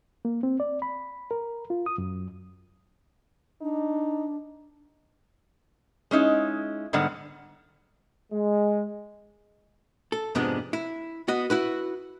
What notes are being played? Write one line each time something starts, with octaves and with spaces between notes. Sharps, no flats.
A#3
C4
D5
B5
A#4
F4
D#6
F#2
D4 D#4
G#3 C#4 D#4 E4
G#2 D3 G3 B3 F#5
G#3
A4
F2 G#2 C3 G#3 B3 D4
E4
B3 F#4 D#5
E4 F#4 B4